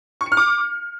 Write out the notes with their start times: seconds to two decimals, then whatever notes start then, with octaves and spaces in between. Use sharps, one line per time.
0.21 C#6
0.26 C#7
0.32 F6
0.37 D6